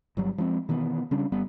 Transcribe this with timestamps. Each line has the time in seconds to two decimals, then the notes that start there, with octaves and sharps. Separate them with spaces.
0.17 G1 F#3 G3
0.38 F3 G#3 B3 C4
0.69 B2 D#3 E3 B3
1.11 C#3 G3 C#4 D4
1.32 G1 G3 B3